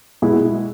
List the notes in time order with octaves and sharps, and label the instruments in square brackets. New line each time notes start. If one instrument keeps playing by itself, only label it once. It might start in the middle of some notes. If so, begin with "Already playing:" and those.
[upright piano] B2 G#3 E4